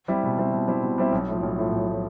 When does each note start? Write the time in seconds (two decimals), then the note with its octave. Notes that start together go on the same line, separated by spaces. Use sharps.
0.08 G3 C4 E4
0.23 B2
0.38 G3 C4 E4
0.53 B2
0.68 G3 C4 E4
0.83 B2
0.98 G3 C4 E4
1.12 B1
1.28 A2 F3
1.43 B1
1.58 A2 F3
1.72 B1
1.88 A2 F3